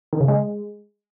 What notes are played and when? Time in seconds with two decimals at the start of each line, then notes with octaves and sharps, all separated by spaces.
0.13 D#3
0.20 C#3
0.28 G#3